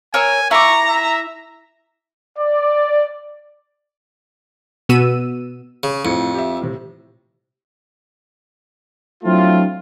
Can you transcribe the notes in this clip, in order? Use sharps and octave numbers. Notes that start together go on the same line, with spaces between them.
A#4 C#5 G#5 E6
E4 A#5 C#6 D6
E5
D5
B2 B3 F#4 E6 D#7
C#3
F2 A2 C#7
G4 E5
A2 C3
F#3 A3 C4 D4 E4 F4